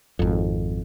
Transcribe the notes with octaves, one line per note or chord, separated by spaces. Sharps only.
G#1 F2